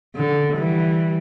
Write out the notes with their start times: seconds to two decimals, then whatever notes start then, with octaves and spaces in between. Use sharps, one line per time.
0.16 D3
0.55 E3 G3